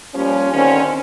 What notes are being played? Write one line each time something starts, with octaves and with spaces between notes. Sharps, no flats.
F3 G3 A#3 C#4
D3 D#3 C4 C#4